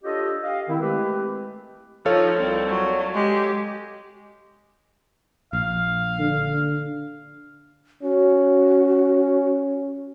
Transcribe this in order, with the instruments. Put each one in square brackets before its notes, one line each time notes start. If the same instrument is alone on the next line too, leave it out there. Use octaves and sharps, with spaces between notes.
[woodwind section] D4 F4 G4 A4 C#5 D#5
G4 D#5 F5
D#3 C4 E4
G#3 A3 C4 G4 B4
[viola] F3 D#4 [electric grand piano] A4 C#5 F5
[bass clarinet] C2 [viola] C4
[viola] F#3
[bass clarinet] G#3 [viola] G4
[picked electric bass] A#1 [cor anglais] F5
[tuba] D3
[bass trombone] C#4 [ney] F#4